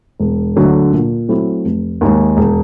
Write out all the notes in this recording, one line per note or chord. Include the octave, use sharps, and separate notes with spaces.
E1
D2 D3 F#3
A#2
F#3 A3 C4 E4
F1
D#2 D#3 G#3
E1